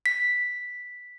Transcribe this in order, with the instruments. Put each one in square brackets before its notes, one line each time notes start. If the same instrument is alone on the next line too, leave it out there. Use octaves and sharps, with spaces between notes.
[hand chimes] B6